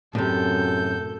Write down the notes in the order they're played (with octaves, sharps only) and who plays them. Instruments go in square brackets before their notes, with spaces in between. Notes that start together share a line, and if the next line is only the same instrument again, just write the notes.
[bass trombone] F#2 [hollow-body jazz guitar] A2 C3 [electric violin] A4 G6